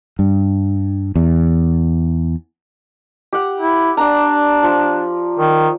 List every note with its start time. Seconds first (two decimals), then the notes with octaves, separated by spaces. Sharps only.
0.19 G2
1.16 E2
3.33 G4 F#5
3.60 E4
3.97 D4 D5 G5 A#5
4.63 F3
5.40 D#3